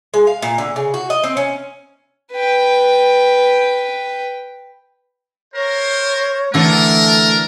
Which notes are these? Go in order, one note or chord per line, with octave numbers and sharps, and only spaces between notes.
G#3
F5
A#2
D3
C#3
F#4
D#5
C4
C#4
B4 G5
A#4 C5 C#5
D3 E3 A3 D4 A4 A#4